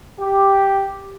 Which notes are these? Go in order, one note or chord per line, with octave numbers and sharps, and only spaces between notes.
G4